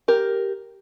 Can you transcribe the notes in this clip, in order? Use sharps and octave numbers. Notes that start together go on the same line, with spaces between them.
G4 A#4